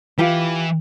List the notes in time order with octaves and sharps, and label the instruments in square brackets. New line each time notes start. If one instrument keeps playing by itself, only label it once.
[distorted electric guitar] E3 [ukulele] F4 G4 B4